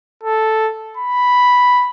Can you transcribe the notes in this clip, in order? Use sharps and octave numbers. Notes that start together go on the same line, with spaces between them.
A4
B5